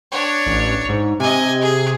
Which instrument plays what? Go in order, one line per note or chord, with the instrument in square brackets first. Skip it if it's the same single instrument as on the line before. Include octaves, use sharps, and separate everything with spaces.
[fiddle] D4 C#5
[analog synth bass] A1
G#2
[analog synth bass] C3 [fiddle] D#5 G#5
[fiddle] G#4